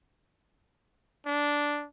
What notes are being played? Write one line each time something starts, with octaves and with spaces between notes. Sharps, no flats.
D4